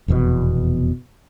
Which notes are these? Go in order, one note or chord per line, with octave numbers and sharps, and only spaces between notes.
F1 E2 G2 B2